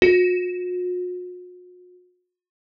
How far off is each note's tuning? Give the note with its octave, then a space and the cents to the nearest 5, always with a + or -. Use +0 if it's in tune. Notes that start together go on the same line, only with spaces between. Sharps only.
F#4 -45